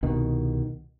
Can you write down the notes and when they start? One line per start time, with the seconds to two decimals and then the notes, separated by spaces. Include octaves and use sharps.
0.03 C2 B2 D#3